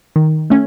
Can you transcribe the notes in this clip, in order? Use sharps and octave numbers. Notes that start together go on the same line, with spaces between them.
D#3
A3 C#4